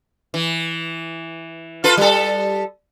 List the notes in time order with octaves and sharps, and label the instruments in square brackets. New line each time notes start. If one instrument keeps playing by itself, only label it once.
[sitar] E3
F4 A4 B4
G3 A4